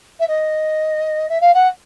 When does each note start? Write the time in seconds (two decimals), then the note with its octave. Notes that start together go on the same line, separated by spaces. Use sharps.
0.19 E5
0.28 D#5
1.29 E5
1.41 F5
1.54 F#5